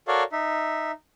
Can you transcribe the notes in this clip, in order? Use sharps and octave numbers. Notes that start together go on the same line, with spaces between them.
F#4 A4 A#4 C#5 D5 F5
D#4 E5